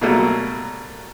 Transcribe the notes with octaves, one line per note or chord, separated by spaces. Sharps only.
B2 F#3 G3 A3 A#3 A#4